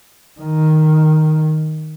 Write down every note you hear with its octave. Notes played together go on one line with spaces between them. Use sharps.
D#3